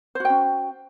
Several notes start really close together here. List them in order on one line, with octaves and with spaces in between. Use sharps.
C5 F#4 G5 C#4